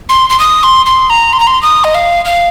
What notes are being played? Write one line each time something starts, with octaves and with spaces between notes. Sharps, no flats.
C6
C6
D#6
C6
C6
A#5
C6
A#5
C6
D#6
D#5
F5
F5